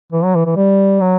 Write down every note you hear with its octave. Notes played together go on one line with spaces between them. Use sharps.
E3
F#3
E3
E3
G3
F#3